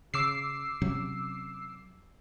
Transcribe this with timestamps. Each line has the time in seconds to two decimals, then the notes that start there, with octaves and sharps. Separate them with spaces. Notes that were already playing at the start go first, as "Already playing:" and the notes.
0.14 C#3 D6 E6 C7
0.82 C3 F#3 C#4